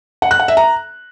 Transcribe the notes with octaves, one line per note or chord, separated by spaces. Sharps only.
F#5
F#6
F#5
E5
A#5